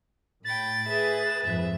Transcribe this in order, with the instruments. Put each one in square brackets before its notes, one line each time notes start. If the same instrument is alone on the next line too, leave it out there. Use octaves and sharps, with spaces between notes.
[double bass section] A2 [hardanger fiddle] G5 B5 [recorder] A6
[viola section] G#4 B4 [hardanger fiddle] E5
[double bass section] F2 G#2 F3 [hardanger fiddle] E5